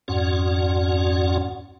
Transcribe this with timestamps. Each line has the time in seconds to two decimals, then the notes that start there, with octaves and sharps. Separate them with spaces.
0.08 F2 G#2 C#4 F#4 D5 F#5